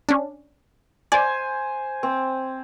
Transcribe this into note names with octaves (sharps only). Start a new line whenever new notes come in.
C#4 D4
C5 D5 G#5
C4